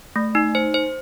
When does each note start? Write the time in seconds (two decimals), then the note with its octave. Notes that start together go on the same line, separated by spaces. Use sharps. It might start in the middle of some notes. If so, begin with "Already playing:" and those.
0.16 A3
0.35 D#4
0.55 C5
0.74 C5